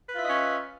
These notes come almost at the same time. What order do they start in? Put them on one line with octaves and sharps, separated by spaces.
B4 F4 E5 D#5 C#4